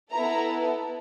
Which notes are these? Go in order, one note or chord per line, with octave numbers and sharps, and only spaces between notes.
B3 E4 A4 A#5